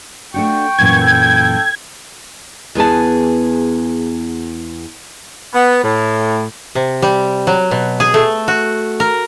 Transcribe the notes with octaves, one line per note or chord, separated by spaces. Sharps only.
A3 D4 F#4 G5 C#6
F#2 A#2 E3 G#6
A4 G5
E2 B3 G#4 A5
B3
A2
C3
G3
F#3
B2
G#4
A3
F#4
A#4